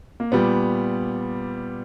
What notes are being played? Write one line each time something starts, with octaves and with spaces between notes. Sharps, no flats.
A#3
A#2 G3 B3